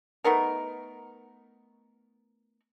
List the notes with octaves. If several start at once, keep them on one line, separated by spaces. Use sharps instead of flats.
A3 B3 D#4 A#4